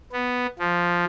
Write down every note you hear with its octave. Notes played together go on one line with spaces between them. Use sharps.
B3
F3